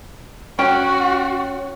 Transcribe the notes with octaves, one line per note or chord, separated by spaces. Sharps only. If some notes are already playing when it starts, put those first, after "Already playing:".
C#4 F#4 G5